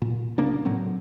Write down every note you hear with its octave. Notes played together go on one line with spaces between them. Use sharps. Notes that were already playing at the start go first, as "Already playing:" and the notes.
A#2
C2 C#3 A#3 D4
A2 F#3 C4